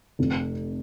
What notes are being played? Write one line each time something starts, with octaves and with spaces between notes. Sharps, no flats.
F1 F2 C3